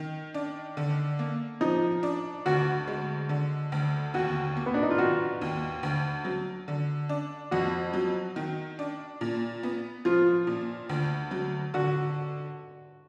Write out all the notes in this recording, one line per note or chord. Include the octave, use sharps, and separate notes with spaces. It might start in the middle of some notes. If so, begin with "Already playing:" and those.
Already playing: D#3
D4
D3
A#3
F3 D#4
D4
D2 F#4
G#3
D3
D2
D#2 F#4
A#3
B3
D4
D#4
F4
D#3 F#4
D#2
D2
F#3
D3
D4
F2 F#4
F#3
D#3
D4
A#2
B3
F3 F4
A#2
D2
F#3
D3 F#4